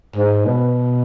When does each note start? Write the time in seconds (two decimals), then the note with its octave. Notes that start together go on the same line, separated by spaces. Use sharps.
0.16 G#2
0.45 B2